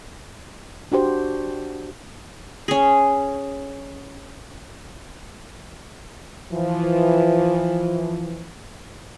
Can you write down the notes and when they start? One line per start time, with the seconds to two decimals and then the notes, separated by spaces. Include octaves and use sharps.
0.92 D4 F#4 G4 C5
2.68 C#4 G#4
6.52 E3 F3